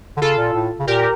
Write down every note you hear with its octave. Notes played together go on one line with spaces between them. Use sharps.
D3
C#3 F4 A4
A#2
A2
C#3
A#2 G4 A#4